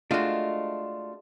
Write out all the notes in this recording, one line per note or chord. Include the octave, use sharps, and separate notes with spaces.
G#3 A3 D4 F4 F#4